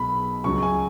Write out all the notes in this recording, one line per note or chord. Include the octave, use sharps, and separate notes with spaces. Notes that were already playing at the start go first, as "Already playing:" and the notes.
Already playing: B1 B2 G#3 B5
C#2 C#3 F#3 C#6
G#5